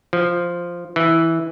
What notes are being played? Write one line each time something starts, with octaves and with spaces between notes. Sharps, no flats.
F3
E3